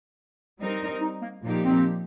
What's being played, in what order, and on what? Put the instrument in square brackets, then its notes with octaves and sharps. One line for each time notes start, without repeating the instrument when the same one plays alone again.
[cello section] G3 C4 D#4 A#4
[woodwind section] D#4
A#3
[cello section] A#2 F3 A#3 D#4 G4
[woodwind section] C4